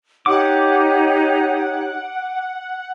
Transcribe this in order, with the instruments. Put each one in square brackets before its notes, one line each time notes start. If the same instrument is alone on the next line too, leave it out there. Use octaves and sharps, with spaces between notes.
[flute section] D#4 G4 C#5 [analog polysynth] F#5 [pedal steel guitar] D6